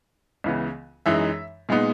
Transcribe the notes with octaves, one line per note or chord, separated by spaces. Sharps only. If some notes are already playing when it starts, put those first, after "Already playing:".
C#2 C#3 E3 B3
F#2 E3 G#3 D#4 E5
A#2 G#3 B3 D#4